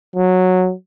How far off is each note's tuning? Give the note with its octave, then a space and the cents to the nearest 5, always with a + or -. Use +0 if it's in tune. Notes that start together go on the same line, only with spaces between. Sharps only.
F#3 -10